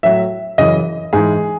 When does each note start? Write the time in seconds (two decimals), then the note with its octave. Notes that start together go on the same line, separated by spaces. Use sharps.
0.03 A2 F#3 E5
0.58 F#2 C#3 E3 D#5
1.13 G#2 E3 G#4